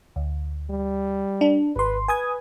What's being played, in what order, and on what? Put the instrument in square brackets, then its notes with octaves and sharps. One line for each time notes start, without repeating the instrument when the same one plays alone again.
[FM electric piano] D2
[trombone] G3
[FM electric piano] D4
[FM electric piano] G#1 C6 [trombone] B4
[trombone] B4 [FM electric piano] G#5 D#6 G#6